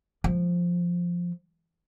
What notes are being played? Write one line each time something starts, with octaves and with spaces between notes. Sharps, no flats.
F3